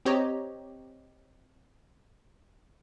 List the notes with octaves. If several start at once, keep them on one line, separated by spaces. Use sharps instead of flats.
C4 G4 C#5 D#5 A#5